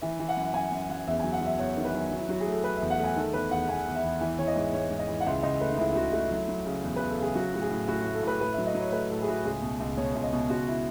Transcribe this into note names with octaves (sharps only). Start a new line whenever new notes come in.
E3 E5
E3
F#5
F#2
F#2 G#5
F#2
F#2 F#5
E2 E5
F#3 G#5
F#5
F#3 E5
E2 C#5
D#3
B4
F#3
F#3
E4
F#3 F#4
G#4
A3
A4
A3 B4
E5
E2
F#5
A3
G#5
D#3 A4
E2 B4
E2 F#5
E2 G#5
E2
E5
E2
E3 E5
E3 C#5
D#5
G#2
G#2 C#5
G#2
D#5
E3
F#5
C#2 E5
C#2 D#5
A3 B4
D#4
C#2 E4
E4
C#2 F#4
A3 F#4
F#3 E4
F#3
C#3
E2
E2 B4
A4
C#3 G#4
F#3 F#4
A2 F#4
G#4
A2
A2 F#4
F#4
A3
A4
A2 B4
A2 B4
E5
F#3
D#5
F#3
C#5
A3 B4
A2 A4
G#4
A2 F#4
C#2 G#4
B2
C#2
B2 C#5
C#2
D#5
B2
C#2 F#4
E4